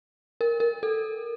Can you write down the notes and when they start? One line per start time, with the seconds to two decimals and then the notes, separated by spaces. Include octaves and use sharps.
0.41 A#4
0.60 A#4
0.83 A4